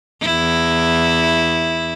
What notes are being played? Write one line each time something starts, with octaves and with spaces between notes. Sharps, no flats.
E2 E4